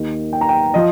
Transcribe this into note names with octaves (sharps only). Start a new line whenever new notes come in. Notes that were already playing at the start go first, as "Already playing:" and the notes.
Already playing: D#2 D#3 A#3
G5
A#5
G5
F3 D#5